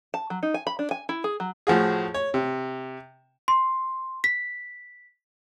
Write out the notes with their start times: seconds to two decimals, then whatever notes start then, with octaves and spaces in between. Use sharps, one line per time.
0.14 A5
0.30 F#3
0.43 D#4
0.54 G#5
0.67 B5
0.79 D4
0.91 G#5
1.09 E4
1.24 G#4
1.40 F#3
1.67 A2 F3 F#4 G#4
2.14 C#5
2.34 C3
3.48 C6
4.24 B6